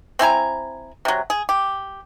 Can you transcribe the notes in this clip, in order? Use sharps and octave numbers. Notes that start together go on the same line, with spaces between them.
C4 E4 G#5 A#5
C3 F#3
G#4
G4